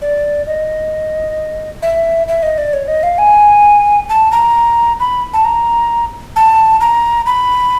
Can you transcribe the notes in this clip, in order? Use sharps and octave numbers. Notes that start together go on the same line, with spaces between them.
D5
D#5
E5
E5
D#5
D5
C#5
D#5
F5
G#5
A5
A#5
B5
A5
A#5
A5
A#5
B5